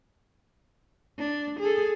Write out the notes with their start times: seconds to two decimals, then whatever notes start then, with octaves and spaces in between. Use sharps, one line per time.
1.19 D4
1.60 G#4 A4